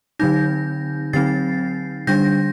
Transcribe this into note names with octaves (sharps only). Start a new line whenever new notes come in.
D3 F#3 C4 D#4 G6 A#6
D3 F#3 C4 D#4 A6 C7
D3 G3 D4 G6 A#6